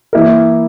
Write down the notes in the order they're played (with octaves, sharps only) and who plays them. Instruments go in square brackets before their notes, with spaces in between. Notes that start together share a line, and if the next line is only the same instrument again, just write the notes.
[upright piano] E3 A#3 E4 A#4